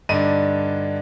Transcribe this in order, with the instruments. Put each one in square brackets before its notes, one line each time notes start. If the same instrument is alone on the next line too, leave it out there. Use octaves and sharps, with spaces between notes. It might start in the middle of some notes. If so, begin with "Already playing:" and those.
[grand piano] G2 D3 D4 D#4 D#7